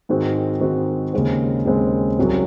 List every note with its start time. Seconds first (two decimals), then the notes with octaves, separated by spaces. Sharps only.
0.09 G#2 D#3 G#3 C4 F#4
0.61 G#2 D#3 G#3 C4 F#4
1.14 D#2 C#3 G#3 C4
1.65 D#2 C#3 G#3 C4
2.18 C2 C3 F#3 C#4 F#4